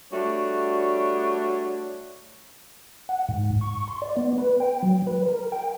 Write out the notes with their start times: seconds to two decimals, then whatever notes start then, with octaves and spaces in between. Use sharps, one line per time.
0.12 G3 A3 D4 F#4 C#5
3.09 F#5
3.29 G#2
3.61 C#6
3.88 C6
4.02 D5
4.17 B3
4.38 B4
4.60 G5
4.83 F#3
5.07 B4
5.28 A#4
5.52 G5